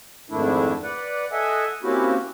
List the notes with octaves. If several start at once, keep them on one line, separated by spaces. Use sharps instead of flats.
F2 G#2 D#3 A3 D4 E4
B4 D5 F#5
A4 D#5 E5 F#5 G#5
A#3 C4 C#4 E4 F#4 G4